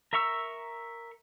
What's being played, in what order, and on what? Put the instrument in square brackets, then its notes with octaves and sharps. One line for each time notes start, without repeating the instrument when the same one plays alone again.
[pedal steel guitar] A#4 E5 A#5 C#6 E6